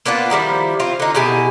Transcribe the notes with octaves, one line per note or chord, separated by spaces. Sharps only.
A#3 B3 D4 F4
D#3 F3 G3 E4
C4 F4
D3 D#4
B2 E4 G4 G#5